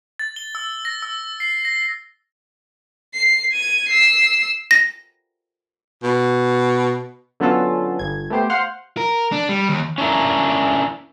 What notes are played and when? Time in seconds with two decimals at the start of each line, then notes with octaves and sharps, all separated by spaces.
0.19 A6
0.36 G7
0.55 E6
0.85 A#6
1.02 E6
1.40 C7
1.65 A#6
3.14 C7
3.53 G#6 D#7
3.88 E6 C7
4.71 A#6
6.03 B2
7.40 D3 F#3 B3 C#4 F4 A4
7.99 G1 G#6
8.30 A3 B3 G4 C5
8.50 C5 F5 F#5 C6 F6
8.97 A#4
9.32 D4
9.49 G3
9.69 D#2
9.98 C#4 D4 E4 A#4